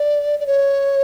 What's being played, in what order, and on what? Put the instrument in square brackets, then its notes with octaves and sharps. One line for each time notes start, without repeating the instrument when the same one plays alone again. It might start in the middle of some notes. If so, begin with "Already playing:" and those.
Already playing: [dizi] D5
D5
C#5